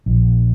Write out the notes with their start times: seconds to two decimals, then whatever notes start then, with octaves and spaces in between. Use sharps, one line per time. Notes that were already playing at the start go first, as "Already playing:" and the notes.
0.06 A#1